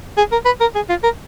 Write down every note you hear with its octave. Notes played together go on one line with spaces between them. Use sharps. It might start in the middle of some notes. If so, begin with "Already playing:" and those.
G#4
A#4
B4
A#4
G#4
F4
A#4